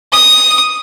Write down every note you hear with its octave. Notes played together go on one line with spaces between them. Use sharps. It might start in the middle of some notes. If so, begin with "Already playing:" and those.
D#6